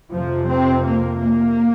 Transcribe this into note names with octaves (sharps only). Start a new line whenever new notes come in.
F2 C3 F3
C4
A#3
A#3